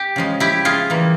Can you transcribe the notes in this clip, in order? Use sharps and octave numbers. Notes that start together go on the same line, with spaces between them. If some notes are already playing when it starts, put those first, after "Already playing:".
Already playing: G4
C#3 F3 G#3
E4 G4
F4 G#4
E3 G3 A#3